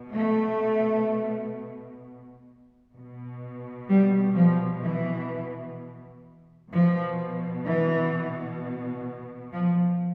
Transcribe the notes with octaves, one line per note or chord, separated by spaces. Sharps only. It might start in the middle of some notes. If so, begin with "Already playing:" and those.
Already playing: B2
A3
B2
G3
F3
E3
B2 F3
E3
F3